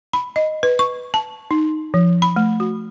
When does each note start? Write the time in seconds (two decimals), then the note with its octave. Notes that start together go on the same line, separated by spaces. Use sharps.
0.13 B5
0.36 D#5
0.63 B4
0.79 C#6
1.14 A5
1.51 D#4
1.94 F3
2.22 B5
2.36 A3
2.60 F#4